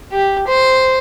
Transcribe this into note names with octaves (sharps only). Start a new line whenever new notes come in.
G4
C5